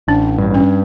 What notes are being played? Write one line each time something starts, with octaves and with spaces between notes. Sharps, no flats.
A1 D4
G2
C#4